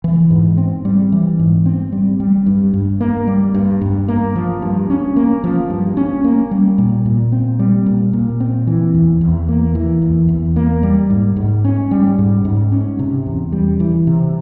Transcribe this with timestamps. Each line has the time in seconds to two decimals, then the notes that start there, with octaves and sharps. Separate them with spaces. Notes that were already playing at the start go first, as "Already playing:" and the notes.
0.04 E3
0.31 G#2
0.58 C4
0.85 G3
1.12 E3
1.39 G#2
1.66 C4
1.92 G3
2.20 G3
2.46 G2
2.74 G2
3.01 A#3
3.28 G3
3.54 G2
3.81 G2
4.08 A#3
4.36 F3
4.62 G2
4.90 C#4
5.16 A#3
5.44 F3
5.70 G2
5.97 C#4
6.24 A#3
6.51 G3
6.78 A#2
7.06 A#2
7.32 C4
7.59 G3
7.86 A#2
8.13 A#2
8.40 C4
8.67 E3
8.94 E2
9.21 E2
9.49 A#3
9.75 E3
10.02 E2
10.29 E2
10.56 A#3
10.83 G3
11.10 G#2
11.36 G#2
11.64 C#4
11.91 G3
12.19 G#2
12.45 G#2
12.72 C#4
12.99 C3
13.26 E2
13.52 G3
13.80 E3
14.07 C3